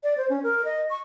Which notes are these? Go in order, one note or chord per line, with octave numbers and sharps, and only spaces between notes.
D5
C5
C#4
A#4
D#5
C#6